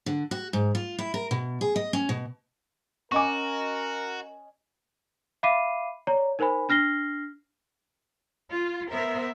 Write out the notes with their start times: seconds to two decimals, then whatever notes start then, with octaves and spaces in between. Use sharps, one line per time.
0.06 D3
0.31 F#4
0.53 G#2
0.75 F4
0.99 E4
1.14 A#4
1.31 B2
1.61 G#4
1.76 D#5
1.93 C#4
2.09 B2
3.12 C#4 F#4 A#4 D#5 G#5 C#6 D6
5.43 E5 F5 B5 D6 C7 D#7
6.07 C#5 D5 A#5
6.39 D#4 A#4 C5 G#5 B5
6.69 D4 F6 A#6 C7 G7
8.52 F4
8.92 B3 A#4 C5 E5